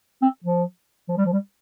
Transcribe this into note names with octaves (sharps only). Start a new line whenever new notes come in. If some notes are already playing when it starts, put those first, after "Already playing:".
C4
F3
F3
G3
F3
G3